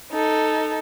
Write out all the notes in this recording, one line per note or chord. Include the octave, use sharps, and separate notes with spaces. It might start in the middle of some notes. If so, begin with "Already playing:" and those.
D#4 A4